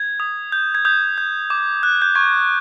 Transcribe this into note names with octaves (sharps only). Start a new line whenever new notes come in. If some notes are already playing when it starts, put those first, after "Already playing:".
Already playing: G#6
D#6
G6
G#6
D#6 G6
G6
D6
F#6
G6
C#6 G#6